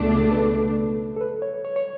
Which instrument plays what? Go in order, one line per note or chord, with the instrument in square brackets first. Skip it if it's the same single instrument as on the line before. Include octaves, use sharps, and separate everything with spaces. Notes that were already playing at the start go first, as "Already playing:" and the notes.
Already playing: [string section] C#2 B2 A3 D4 [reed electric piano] A4
[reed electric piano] A4
B4
A4
B4
C#5
C#5
C#5